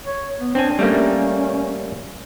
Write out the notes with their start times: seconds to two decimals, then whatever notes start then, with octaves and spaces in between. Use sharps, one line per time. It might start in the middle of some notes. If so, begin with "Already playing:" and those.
0.06 C#5
0.40 B3
0.55 C4 D4 G#5
0.79 G3 A3 A#3 C#4